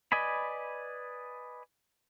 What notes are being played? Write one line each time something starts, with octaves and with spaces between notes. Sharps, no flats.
B4 D5 D#5 G#5 B5